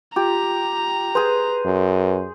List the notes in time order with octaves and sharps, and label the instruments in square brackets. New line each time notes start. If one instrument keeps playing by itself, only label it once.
[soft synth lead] F4 [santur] G4 [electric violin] A#5
[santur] G#4 C5 [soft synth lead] B4
[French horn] F#2